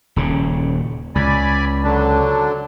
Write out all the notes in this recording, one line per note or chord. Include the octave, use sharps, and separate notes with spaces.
D#1 C#3
C#2 D5 G#5 B5
D3 F#3 D4